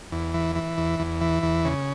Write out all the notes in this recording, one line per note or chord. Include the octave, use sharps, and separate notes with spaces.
E2
E3
E3
E2
E2
E3
E2
C#3